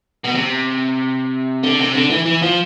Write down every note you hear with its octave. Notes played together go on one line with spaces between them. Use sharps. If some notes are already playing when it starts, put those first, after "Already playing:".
B2
C3
D3
C3
D3
E3
E3
F3